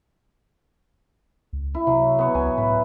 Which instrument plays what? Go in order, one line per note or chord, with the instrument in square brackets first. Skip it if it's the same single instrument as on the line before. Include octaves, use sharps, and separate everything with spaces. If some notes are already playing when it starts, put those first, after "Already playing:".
[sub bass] C#2
[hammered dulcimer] E4
[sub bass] C3 [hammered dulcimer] F#3
[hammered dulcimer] B3 C#5
[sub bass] C#2 [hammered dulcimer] G#5
[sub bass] A2 [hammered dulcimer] B4